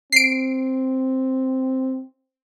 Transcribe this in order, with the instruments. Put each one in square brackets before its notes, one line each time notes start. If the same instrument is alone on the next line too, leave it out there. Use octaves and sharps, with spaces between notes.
[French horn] C4 [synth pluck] C7 D7